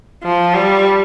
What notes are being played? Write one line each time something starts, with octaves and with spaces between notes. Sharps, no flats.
F3
G3